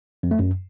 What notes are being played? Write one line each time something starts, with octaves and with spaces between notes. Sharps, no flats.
F2
A3
F#2